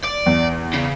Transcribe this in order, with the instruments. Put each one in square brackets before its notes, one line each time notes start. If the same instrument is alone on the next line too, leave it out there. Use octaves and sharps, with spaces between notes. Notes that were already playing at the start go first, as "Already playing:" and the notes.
[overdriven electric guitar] D5
[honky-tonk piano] E2
[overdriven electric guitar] C#3